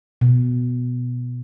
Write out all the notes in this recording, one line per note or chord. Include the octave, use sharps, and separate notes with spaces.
B2